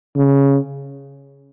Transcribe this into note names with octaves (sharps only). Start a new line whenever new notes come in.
C#3